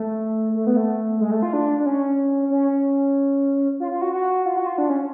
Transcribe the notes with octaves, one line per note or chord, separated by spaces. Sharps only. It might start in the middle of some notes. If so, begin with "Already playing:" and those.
Already playing: A3
A3
B3
A3
G#3
A3
F4
D4
D4
C#4
C#4
F4
F4
F#4
F#4
F4
F#4
F4
D4
C#4